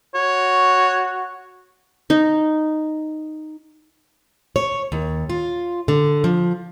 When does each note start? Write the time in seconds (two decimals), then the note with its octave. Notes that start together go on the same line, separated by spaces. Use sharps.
0.15 F#4 C#5
2.10 D#4
4.56 C#5
4.92 D#2
5.30 F4
5.88 D3
6.24 F3